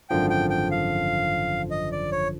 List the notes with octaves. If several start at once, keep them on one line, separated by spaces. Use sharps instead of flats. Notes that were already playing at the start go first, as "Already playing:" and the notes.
G#1 F#2 D3 F3 G5
G5
G5
F5
D#5
D5
C#5